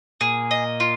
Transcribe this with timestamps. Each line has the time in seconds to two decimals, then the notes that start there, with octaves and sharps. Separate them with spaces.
0.21 A#2 G#4
0.51 D#5
0.80 F4